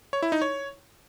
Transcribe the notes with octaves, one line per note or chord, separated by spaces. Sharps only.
C#5
E4
D#4
C#5